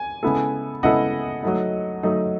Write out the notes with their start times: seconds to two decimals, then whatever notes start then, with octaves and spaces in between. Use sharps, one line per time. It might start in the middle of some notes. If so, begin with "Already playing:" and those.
Already playing: G#5
0.23 C#3 G#3 B3 E4 A4
0.83 C#3 G#3 B3 E4 A4 D#5 F#5
1.43 F#3 A3 D#4
2.03 F#3 A3 D#4